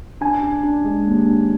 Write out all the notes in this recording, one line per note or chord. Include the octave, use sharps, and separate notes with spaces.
D4 G#5
D4
D4
G#3
D#2
D4